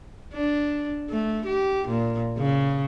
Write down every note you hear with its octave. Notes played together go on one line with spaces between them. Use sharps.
D4
A3
G4
A#2
C#3